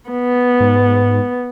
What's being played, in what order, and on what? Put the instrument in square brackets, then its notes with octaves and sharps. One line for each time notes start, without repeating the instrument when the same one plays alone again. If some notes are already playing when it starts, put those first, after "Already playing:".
[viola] B3
[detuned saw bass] G#2